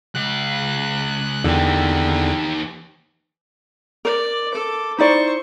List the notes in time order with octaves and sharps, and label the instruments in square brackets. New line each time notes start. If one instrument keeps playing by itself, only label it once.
[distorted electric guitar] C#2 F5 [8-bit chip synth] F#6
[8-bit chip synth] E2 D3 [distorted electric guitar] D#3 G4
[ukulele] A#4 [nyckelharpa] D5
[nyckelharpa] A4 D6
[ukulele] D#4 E4 D5 [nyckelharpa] C5 C#6